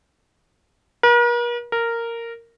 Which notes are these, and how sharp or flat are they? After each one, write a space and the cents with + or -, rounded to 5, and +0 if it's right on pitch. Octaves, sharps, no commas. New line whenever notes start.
A#4 +45
A#4 -10